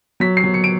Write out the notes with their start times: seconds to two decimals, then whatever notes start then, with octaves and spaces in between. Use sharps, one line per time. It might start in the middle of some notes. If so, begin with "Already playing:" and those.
0.20 F#3 B6
0.37 C7
0.44 F#3
0.54 C#7
0.64 D7